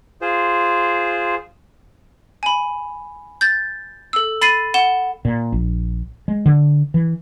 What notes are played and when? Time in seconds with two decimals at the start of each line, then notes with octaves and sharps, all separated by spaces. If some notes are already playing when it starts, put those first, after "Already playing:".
0.21 F4 G#4 C5
2.43 G#5 B5
3.41 G6 A6
4.13 A4 E6
4.42 B5 A6 C7 D#7
4.74 F#5 E7 G7
5.25 A#2
5.52 A#1
6.28 G#3
6.46 D3
6.94 E3